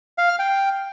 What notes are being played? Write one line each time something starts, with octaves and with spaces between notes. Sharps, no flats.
F5
F6
G5